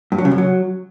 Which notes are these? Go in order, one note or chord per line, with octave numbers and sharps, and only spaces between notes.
G2
F#3
C#3
F#2
F#3